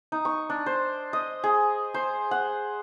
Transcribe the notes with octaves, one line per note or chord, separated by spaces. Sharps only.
D#4
C#6
D4
C5
D#5
G#4
C5
F#5